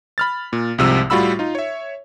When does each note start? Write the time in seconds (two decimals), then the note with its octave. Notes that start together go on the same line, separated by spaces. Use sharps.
0.18 B5 F6 A6
0.53 A#2
0.78 C2 G#2 C3 F3 E6
1.10 A2 G3 F4 F#4 B5 E6
1.39 D#4 F4
1.55 C#5 E5